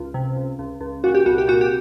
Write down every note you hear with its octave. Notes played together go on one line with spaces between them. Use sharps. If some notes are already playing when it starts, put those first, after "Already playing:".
Already playing: C#2 F4
C3
C#2
C#2
C#2
A#2 F#4
G4
C2 F#4
G4
A#2 F#4
G4